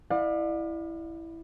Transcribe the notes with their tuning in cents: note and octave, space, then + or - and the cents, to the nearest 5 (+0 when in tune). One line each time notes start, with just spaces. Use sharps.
E4 +0 D5 +35 F5 +45